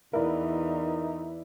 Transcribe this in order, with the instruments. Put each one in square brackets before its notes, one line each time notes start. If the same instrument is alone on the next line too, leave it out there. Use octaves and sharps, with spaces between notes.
[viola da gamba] E2 [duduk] D#4 [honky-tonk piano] E4 B4 D5 [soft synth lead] A#4